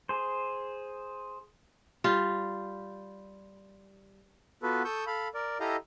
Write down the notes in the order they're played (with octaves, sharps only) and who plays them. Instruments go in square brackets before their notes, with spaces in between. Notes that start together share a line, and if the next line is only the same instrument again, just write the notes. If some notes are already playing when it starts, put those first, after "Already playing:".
[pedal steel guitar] G#4 C5
[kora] G3 F4
[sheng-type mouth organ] B3 F4 F#4 A4 B4
A4 C#6 D#6 E6 G6
A4 F5 B5
A#4 D5
E4 G4 A4 D#5 F5 A#5